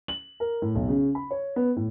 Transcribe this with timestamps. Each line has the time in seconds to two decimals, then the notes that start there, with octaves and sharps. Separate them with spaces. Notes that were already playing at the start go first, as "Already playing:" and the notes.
0.08 F#7
0.40 A#4
0.62 A2
0.75 B1
0.89 C#3
1.15 B5
1.31 C#5
1.56 B3
1.76 A2